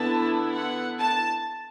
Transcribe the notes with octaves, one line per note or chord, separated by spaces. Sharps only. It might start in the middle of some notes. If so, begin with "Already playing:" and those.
Already playing: D3 B3 E4 A5
F#5
A5